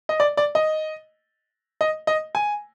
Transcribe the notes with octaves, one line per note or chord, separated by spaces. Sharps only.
D#5
D5
D5
D#5
D#5
D#5
G#5